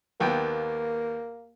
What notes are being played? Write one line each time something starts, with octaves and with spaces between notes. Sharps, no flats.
D#2 A#3 B3 G5